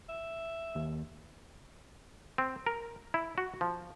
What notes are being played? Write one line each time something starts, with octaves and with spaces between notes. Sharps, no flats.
E5
D#2
C4
A#4
E4
F#4
F3